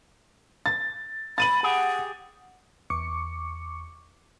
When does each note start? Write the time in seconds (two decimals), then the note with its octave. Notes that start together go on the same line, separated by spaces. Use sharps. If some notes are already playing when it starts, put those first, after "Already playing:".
0.66 A6
1.38 B5 A6 D#7 F#7
1.63 G4 G#4 F#5
2.90 E2 C#6 D6 C#7